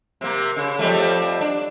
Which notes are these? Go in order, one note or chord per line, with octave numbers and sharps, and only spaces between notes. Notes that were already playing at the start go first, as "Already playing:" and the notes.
C3 A#3
C#3
F2 G3 A3
D4